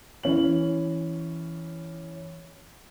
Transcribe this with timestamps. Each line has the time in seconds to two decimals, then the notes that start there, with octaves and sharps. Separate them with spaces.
0.23 E3 C#4 F#7